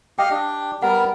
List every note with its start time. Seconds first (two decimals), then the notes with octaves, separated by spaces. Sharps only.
0.19 G4 D#5 F5 G5
0.30 D4 G4
0.82 G3 B3 A#4 F#5